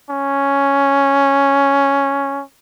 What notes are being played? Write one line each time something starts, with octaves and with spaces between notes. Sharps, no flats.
C#4